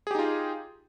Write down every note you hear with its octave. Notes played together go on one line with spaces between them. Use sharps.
D#4 F4 G4 G#4